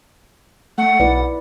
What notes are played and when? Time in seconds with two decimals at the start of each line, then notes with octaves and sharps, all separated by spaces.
0.78 A3 F#5
1.00 B1 E4 B4 D5